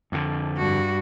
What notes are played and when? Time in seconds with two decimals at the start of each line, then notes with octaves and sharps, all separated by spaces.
0.12 F2 D3
0.57 G2 F#4